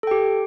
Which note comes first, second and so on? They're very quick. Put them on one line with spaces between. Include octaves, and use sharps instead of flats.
A4 G5 G4